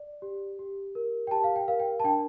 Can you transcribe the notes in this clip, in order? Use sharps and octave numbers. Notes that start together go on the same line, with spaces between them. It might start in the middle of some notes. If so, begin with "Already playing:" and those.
Already playing: D5
G4
G4
A#4
G5
G4 A5
F5
G5
A#4 F5
G5
A5
D4 G5